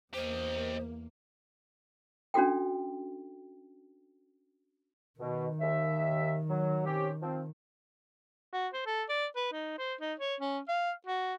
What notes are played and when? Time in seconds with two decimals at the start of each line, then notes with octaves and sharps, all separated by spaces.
0.14 E2 A#3 G4 C5 D#5
2.34 C#4 D4 F#4 A4 G5
5.20 B2 D#3
5.61 D#2 E5
6.49 F#3
6.86 C4 C#4 G4
7.21 F3 C4
8.53 F#4
8.74 C5
8.86 A4
9.09 D5
9.36 B4
9.53 D#4
9.78 C5
10.01 D#4
10.20 C#5
10.40 C#4
10.69 F5
11.07 F#4